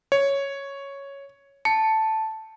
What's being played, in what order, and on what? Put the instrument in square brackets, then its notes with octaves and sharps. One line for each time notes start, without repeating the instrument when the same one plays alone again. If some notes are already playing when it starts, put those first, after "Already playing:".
[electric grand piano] C#5
[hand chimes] A5 [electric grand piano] C#7